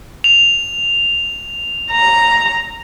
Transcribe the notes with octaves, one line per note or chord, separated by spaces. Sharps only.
F7
A#5